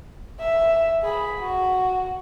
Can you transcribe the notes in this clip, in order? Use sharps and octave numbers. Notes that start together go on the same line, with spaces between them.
E5
G#4 B5
F#4